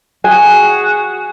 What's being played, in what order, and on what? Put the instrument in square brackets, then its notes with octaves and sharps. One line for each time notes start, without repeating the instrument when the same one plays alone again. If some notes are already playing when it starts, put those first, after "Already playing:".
[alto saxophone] F#4 [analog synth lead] G#4 [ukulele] G#5